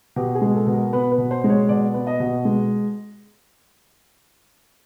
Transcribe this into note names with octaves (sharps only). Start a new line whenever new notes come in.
B2 G4
G#4
G#3
A4
B2
A#4
B3 B4
B4
B2
C5
G#3
C#5
B2 D5
B3
D#5
B2
G#3